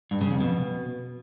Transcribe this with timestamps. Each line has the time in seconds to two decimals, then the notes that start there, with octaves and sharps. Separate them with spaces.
0.11 G2
0.21 C#3
0.31 F2
0.41 B2